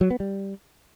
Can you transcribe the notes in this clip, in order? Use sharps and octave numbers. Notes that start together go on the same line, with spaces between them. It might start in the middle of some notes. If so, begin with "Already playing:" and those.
F#3
B3
G3